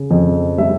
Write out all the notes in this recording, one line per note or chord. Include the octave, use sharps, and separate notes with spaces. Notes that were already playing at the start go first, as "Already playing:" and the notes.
Already playing: C#3
F2
G3 E5